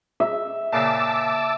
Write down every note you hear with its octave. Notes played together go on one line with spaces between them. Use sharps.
E5
A#2 C#3 A5 D6 E6